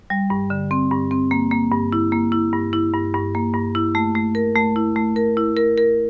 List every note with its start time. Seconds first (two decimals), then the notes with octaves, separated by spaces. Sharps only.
0.10 G3
0.30 G2
0.50 D3
0.71 C4
0.91 G2
1.11 C4
1.31 A#3
1.51 A#3
1.72 G2
1.93 E4
2.12 A#3
2.32 E4
2.53 G2
2.73 E4
2.94 G2
3.14 G2
3.35 A#3
3.54 G2
3.75 E4
3.95 A3
4.15 A3
4.35 A#4
4.55 A3
4.76 E4
4.96 A3
5.16 A#4
5.37 E4
5.57 A#4
5.78 A#4